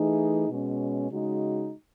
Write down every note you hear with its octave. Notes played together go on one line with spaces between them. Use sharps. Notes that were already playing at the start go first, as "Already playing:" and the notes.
Already playing: E3 A3 D#4 G#4
B2 G#3 C#4
C#3 G#3 D#4 F#4